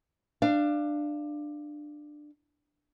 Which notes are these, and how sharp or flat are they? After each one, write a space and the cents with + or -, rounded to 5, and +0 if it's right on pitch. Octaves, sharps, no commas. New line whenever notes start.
D4 +15 F5 -15